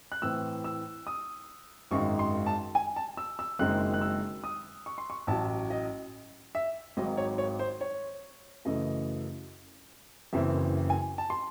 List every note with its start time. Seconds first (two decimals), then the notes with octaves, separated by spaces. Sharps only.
0.12 F#6
0.22 A2 E3 C4 E4 E6
0.64 E6
1.07 D#6
1.91 G#1 F#2 D#3 G#3 C#6
2.19 C6
2.46 A5
2.75 G#5
2.96 A5
3.17 E6
3.39 E6
3.59 F#1 F#2 D#3 G#3 C4 F#6
3.94 F#6
4.01 E6
4.44 D#6
4.86 C#6
4.98 C6
5.10 C#6
5.27 A1 A2 F#3 A5
5.70 D#5
6.55 E5
6.97 G#1 G#2 D#3 F#3 D#5
7.17 C#5
7.38 C#5
7.59 C5
7.81 C#5
8.65 F#2 C#3 E3 A3 D#5
10.33 F#1 F#2 C#3 E3 C4 E5
10.90 G#5
11.18 A5
11.30 C6